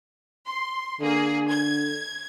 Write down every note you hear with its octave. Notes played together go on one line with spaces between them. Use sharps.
C6
D3 A#3 G#4
G#6